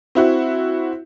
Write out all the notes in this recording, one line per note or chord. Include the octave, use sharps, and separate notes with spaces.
C4 E4 F#4